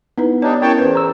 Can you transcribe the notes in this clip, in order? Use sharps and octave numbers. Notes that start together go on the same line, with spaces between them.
B3 D#4 E4 B4
G3 D4 D#4 C#5
C#4 E4 A#4 C#5 G5 A5
E2 B4 C5
A#5 E6